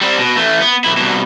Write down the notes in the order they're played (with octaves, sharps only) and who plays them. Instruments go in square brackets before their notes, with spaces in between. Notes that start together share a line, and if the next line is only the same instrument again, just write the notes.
[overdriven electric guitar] G3 C4
B2
E3 A3
B3
B1 E4
C2 B2